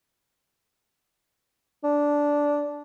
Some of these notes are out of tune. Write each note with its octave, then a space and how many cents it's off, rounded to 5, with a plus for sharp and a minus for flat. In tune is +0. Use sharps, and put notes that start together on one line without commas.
D4 -10